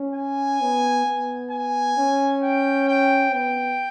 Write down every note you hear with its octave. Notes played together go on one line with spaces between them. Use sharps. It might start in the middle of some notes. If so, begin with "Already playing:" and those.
Already playing: C#4
G#5
B3
B3
G#5
C#4
G5
G5
B3 G5